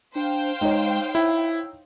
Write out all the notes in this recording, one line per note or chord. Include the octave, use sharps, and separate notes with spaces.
D4 C5 F5 G5
G#3 D#4 C#5
E4 E6